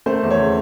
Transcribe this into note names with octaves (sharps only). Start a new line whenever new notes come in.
A3 C5
E2
C#5
C#3